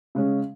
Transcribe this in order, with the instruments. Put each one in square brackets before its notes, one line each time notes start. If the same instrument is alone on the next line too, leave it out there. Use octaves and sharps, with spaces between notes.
[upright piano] C#3 G#3 C#4